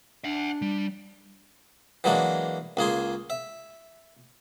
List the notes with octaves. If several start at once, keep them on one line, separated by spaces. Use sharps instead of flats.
D4 E5 F#5
G3
E3 F#3 G#3 A#3 D4
C#2 A#3 G#4 C6
E5